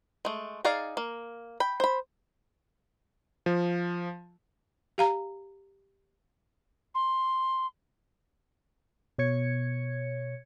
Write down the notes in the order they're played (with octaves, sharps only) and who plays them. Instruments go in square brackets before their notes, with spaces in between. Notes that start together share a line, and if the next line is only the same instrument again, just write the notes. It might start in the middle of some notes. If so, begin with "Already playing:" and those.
[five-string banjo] G#3 A3
D#4 G#4 D5 F5
A#3
G5 B5
C5 B5
[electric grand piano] F3
[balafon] G4 F5 A#5
[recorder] C6
[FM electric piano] B2 C#5 G#6 C#7